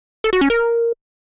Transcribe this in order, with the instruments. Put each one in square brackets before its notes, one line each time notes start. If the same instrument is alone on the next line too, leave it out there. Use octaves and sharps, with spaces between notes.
[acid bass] A4
F#4
C#4
A#4